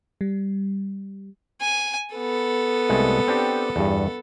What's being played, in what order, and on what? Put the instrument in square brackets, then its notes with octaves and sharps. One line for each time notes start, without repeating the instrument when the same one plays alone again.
[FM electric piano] G3
[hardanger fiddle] G#5
B3 A4
[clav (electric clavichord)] C2 G#3 A3
C4 D4 G4
E2 G2